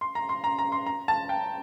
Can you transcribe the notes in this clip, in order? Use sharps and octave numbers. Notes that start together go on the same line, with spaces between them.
C6
A#5
C6
A#5
A#5
C6
A#5
A5
G5